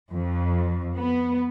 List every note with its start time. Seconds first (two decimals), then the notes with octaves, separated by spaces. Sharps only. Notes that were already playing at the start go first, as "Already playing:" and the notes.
0.11 F2
0.96 B3